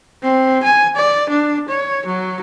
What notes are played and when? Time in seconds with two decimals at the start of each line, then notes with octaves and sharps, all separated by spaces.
0.23 C4
0.63 G#5
0.96 D5
1.29 D4
1.68 C#5
2.06 F#3